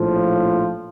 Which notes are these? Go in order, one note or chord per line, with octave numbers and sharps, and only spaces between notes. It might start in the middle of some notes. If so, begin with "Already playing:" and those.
Already playing: A#1 A2 F3